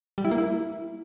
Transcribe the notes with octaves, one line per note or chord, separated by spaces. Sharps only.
G3
E4
A#3
E4